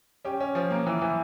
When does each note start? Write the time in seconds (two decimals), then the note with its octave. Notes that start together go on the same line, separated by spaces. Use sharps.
0.25 C#4 G4
0.40 C#4
0.55 F3
0.71 A#3
0.86 E3
1.02 E3